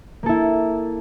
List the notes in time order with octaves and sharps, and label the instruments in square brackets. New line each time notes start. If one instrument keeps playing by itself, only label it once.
[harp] A#3
A4
E4